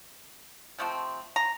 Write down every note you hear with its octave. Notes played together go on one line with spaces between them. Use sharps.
C3 F3 A3 C4
A#5